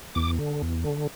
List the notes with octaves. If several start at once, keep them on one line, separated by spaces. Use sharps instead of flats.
E2 D6
D3
E2
D3